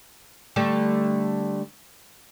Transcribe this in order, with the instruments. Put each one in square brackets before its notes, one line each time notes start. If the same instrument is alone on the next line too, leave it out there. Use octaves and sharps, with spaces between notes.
[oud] D3 G3 A3